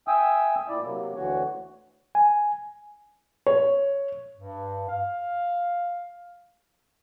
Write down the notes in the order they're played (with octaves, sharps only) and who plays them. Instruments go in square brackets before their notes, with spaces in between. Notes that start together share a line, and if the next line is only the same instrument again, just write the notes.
[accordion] E5 G5 G#5 D#6 E6
A#2 E4 D5
C3 F#3 A#3
D2 D3 E3 F#4 C#5
[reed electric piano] G#5
[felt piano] C#5
[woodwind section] G2
F5